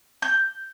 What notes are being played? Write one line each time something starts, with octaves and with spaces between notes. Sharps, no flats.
G6